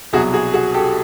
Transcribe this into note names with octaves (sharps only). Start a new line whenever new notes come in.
C2 B2 F#3 F#4 G#4
F#4 G#4
F#4 G#4
G4 A4